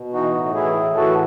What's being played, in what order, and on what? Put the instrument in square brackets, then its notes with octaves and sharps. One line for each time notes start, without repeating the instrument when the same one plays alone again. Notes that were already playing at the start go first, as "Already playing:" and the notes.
Already playing: [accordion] B2
E3 D#4 F#4
A2
E3 E4 G#4
A2
E3 F#4 A4